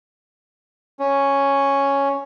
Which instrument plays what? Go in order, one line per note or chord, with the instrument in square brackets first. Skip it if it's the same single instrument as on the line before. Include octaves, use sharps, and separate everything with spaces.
[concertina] C#4